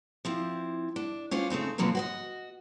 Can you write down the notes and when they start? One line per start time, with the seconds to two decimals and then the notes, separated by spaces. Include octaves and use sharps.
0.25 F3 C4 E4
0.96 D4
1.31 C#4 D4 F4 C5
1.50 C#3 A3 C4 D#4
1.78 B2 D3 F3 F#3 A#3 C4
1.95 F#4 C5 D#5